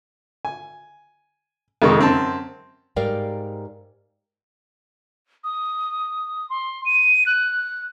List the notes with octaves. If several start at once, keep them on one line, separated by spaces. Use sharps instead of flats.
G#5
F2 C3 D#3 G#3 D#4 C#6
F#2 C4 A5
G#2 G3 A#4 D5 F5 G5
D#6
C6
D#7
F#6